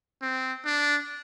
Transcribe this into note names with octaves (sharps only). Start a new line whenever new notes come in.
C4
D4